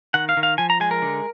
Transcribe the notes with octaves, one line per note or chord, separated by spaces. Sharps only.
D#3 F#5
F5
D#3
F5
F3 G#5
A#5
G#3 G#5
A#4
D3